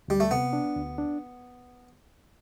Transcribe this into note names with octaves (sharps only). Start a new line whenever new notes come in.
D2 G3
A3
C3 B3
D4
D2
D4